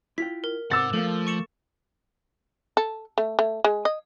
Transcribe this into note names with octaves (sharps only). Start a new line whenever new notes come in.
E4 F4 G5 B6
A#4
G#2 C3 F#5 D6 E6 A6
F3 A3 A#3 A4 A#4 F5
C#6 C#7 E7
A4
A3
A3
G#3
D#5